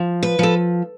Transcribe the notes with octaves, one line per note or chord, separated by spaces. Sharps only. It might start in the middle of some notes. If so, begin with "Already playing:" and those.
Already playing: F3
B4
F3 A4